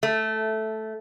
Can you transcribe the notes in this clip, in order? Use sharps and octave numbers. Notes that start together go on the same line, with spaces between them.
A3